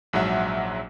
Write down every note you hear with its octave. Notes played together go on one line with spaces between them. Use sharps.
A#1 G#2 F#3 E5 F#5